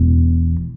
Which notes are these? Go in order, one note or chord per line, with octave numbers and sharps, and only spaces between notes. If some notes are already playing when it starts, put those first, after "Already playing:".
Already playing: E1 E2